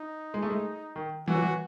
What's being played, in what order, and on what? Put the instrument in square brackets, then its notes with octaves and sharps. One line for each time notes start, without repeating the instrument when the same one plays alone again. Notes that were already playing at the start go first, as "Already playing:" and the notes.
Already playing: [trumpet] D#4
[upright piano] G#3
A3
G#3
D#3
[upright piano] E3 [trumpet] F#4
[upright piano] F#3
E3